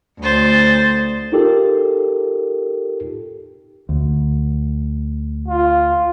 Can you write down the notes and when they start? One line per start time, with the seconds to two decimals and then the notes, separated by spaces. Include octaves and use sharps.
0.21 D2 C5 A6
1.32 D#4 F4 G4 A4 A#4
3.89 D2
5.48 F4